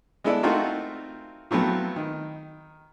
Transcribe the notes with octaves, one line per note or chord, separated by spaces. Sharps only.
G#3 B3 E4 A4 D5
A3 C4 D#4 F4 F#4 A#4
F3 F#3 A3 B3 C4
D#3